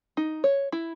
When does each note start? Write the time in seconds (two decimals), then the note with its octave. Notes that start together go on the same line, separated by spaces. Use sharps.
0.17 D#4
0.44 C#5
0.72 E4